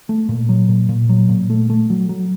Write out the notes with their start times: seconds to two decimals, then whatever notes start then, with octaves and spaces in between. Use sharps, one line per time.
0.09 A3
0.29 A#2
0.49 F#3
0.69 A#2
0.89 A#2
1.09 F#3
1.29 A#2
1.50 A3
1.70 A3
1.90 F#3
2.09 F#3